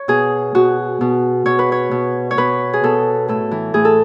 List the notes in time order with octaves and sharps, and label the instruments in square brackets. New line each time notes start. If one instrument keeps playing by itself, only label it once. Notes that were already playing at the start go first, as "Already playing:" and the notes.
Already playing: [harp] C#5
B2 G#4
B2 F#4
B2
B2 C#5
B4
C#5
B2
C#5
B2 B4
G#4
B2 A4
A2 A4
E3
A2 G#4
A4